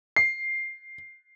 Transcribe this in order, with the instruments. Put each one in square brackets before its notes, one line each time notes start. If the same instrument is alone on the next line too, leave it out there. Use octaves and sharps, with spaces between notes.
[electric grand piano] C7